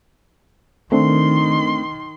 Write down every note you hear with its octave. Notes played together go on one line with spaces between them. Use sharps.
D#3 A3 C4 D4 C6